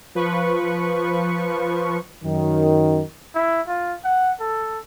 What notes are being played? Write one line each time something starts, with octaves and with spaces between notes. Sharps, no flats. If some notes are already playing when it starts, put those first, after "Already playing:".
F3 B4 C#6
F#2 D#3
E4
F4
F#5
A4